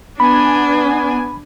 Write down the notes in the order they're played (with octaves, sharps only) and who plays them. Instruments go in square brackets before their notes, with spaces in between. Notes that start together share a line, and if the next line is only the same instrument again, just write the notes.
[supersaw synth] B3 G#5 [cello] D4 [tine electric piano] B5